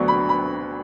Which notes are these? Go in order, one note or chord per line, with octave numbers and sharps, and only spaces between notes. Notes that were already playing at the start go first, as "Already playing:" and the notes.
Already playing: D2 D3 F#3 B3 D4 C#6
B5
B5